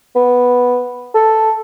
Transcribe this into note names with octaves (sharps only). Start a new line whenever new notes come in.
B3
A4